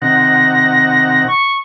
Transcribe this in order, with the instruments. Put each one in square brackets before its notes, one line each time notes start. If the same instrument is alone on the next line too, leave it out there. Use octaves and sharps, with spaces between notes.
[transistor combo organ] C3 D#3 F#5 [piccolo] A#6
[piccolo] C#6